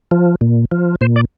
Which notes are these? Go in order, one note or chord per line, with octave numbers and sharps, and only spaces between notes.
F3
A#2
F3
A#2 C5
D5